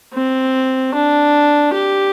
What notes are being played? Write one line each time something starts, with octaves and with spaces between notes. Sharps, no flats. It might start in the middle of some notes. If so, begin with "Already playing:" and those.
C4
D4
G4